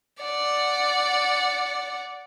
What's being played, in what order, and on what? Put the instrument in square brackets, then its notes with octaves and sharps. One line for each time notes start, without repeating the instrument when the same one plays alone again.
[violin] D5 F#5